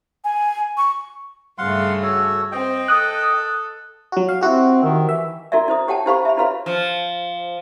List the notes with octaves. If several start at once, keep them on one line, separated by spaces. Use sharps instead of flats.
G#5
C#6
G2 C#3 A3 F5 F#5 C6
F#4 A4 C#5
C4 D#5 G5
A4 D#6 F#6
F#3 F#4
F5
C4 E4 F#4 G4
D#3
E3 E5
E4 F#4 A#4 D5 E5
E4 C5 D#6
G4 C#5 F#5 G5 A5
E4 G4 C5 F5 B5 C#6
E5 B5
E4 F#4 B4 C#5 F5 B5
F3